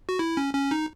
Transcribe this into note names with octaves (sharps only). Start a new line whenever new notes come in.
F#4
E4
C#4
C#4
D#4